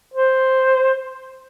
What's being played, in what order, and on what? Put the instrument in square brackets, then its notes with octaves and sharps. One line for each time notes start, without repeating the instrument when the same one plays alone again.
[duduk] C5